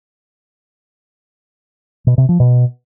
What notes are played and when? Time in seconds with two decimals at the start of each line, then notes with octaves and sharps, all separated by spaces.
2.07 B2
2.18 C3
2.29 F3
2.40 B2